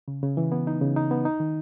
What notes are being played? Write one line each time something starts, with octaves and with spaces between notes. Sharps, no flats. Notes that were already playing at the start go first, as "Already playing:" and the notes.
C#3
C#3
E3
B3
D#4
C#3
D#4
B3
D#4
D#3